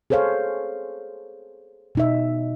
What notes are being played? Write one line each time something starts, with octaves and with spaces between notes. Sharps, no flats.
G#4 A4 C5 C#5 F5
B2 D#4 E5